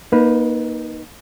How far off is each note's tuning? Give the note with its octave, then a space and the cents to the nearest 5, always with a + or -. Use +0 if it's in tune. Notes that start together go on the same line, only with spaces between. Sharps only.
A#3 +25 D#4 +0 B4 +0